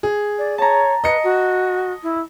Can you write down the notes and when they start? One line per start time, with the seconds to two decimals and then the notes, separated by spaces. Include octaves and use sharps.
0.03 G#4
0.38 D5
0.58 C#5 A5 A#5
1.04 B4 D#5 C#7
1.23 F#4
2.03 E4